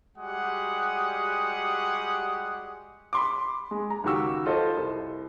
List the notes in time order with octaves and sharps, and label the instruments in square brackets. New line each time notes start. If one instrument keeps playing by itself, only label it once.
[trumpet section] G3 G#3 F#4 G4 F#5 D#6
[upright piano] B5 C6 D6
G#3
A#5
C#2 D#3 F#4 G4 C#6 E6
F4 A4 C5 D#5
C2